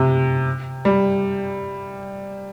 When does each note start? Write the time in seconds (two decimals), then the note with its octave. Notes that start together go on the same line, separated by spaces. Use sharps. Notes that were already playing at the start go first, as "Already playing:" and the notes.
Already playing: C3
0.85 G3